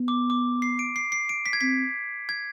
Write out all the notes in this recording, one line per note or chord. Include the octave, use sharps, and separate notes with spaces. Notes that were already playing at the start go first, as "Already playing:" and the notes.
Already playing: B3
D6
D6
C7
D7
C7
C7
D7
B6
G#6
C4 B6
G#6